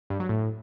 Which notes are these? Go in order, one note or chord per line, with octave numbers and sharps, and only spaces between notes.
G2
F#3
A2